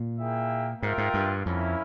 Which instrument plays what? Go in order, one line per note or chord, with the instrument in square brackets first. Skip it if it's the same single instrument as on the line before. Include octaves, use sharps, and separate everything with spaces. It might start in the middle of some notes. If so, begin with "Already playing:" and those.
Already playing: [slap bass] A#2
[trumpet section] A#3 E4 G#4 E5 G5
[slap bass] G#2 [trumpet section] F4 A#4 E5 G5
[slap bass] G#2
G2
[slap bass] F2 [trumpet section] A#3 C#4 E4